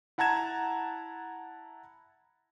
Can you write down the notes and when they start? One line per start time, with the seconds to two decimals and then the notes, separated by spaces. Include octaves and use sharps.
0.18 E4 F#5 A5 A#5 G#6 E7